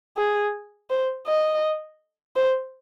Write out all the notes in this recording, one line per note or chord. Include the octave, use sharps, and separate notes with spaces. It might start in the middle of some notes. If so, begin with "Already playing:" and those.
G#4
C5
D#5
C5